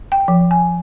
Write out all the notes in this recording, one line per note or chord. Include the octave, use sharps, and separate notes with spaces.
G5
F3
G#5